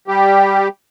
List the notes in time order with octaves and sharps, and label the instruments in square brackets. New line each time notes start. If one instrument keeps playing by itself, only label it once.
[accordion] G3 G4